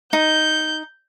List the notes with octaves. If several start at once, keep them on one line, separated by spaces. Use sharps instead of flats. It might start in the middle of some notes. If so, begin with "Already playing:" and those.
D#4 G6